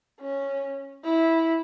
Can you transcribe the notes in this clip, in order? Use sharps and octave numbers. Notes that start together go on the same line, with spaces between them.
C#4
E4